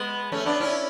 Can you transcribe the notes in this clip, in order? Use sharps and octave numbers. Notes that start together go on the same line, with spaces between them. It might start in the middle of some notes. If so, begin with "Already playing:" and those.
Already playing: G#3 B3
A3 C#4
B3 D4
C#4 E4